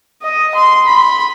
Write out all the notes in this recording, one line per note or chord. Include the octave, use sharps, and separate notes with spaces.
D#5
C6
B5 C6